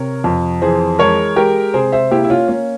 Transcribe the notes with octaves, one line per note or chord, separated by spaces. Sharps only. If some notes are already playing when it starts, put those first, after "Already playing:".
Already playing: C3 A#4 C#5
F2
E3 G#4 C5
G#3 A#4 C#5
G#3 G4 A#4
C3 G#4 C5
C5 E5
A#3 E4 G4
E4
C#4 F4
A#3 C#4